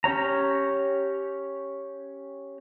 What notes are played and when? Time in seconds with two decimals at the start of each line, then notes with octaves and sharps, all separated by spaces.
0.04 C#4 G4 C#5 A#5